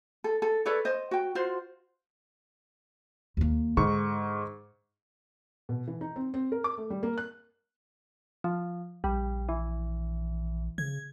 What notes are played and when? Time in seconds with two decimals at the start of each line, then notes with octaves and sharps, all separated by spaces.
0.24 A4
0.42 A4
0.66 A4 B4 C#5 D5
0.85 C5 D#5
1.11 F#4 G5
1.35 F4 F#4 C5
3.37 D#2 A#3
3.77 G#2 D3 C#6
5.69 B2
5.87 E3
6.01 D#4
6.16 C4
6.34 C4
6.52 A#4
6.64 D6
6.78 A3
6.90 G3
7.03 A#3
7.18 F#6
8.44 F3
9.04 A#1 G3
9.49 E3
10.78 C#3 G#6